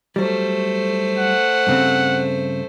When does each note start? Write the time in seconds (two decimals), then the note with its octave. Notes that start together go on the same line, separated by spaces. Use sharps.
0.16 F#3 G3 A3 C5
1.18 F#5
1.67 G2 C#3 C4